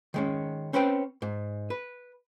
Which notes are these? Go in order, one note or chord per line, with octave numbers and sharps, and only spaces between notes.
D#3 G#3 C#4
C4 C#4 B4 C5 G5
G#2
B4